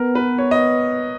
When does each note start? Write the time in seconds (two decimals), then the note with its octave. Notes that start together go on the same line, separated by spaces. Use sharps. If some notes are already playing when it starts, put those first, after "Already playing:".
Already playing: B3 A#4
0.15 B4
0.38 C#5
0.51 D#5